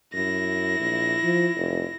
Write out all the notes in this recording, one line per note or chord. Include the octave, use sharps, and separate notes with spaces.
F#2 E4 A#6
A#1
F3
F1